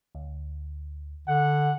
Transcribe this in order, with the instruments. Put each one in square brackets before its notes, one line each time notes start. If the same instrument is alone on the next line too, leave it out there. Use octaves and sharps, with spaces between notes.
[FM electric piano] D2
[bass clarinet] D3 [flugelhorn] F#5